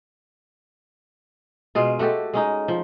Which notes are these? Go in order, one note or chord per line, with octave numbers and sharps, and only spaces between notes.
B2 G#3 F4
A3 F#4 G4 A4
G#3 C#4 D#4
F3